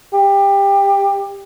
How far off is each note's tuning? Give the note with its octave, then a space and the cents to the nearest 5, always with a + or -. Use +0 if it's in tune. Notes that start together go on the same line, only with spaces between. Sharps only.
G4 +20